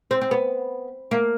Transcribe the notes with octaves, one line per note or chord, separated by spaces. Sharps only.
C4
C4
B3
A#3